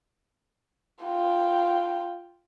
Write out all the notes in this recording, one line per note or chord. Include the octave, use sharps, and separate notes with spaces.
F4 G5